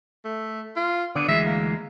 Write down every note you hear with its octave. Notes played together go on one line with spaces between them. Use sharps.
A3
F4
D3 B3 D5
D2 E3 G#3 E5
A#3